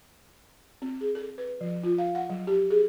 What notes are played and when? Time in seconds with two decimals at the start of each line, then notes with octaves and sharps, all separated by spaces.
0.82 C4
1.01 G#4
1.15 A4
1.38 B4
1.61 F3
1.83 F4
1.98 F5
2.15 F#5
2.30 F#3
2.47 G4
2.70 G#4